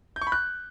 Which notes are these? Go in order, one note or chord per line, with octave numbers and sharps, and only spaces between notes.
G6
C#6
B5
F#6